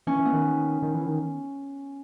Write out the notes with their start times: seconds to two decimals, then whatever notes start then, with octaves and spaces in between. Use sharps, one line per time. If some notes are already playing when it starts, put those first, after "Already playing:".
0.07 E3 C#4
0.19 E3
0.25 B3
0.32 D#3
0.82 D#3
0.94 E3
1.06 D#3